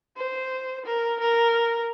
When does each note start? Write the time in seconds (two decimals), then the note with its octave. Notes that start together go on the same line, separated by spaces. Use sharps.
0.17 C5
0.85 A#4
1.20 A#4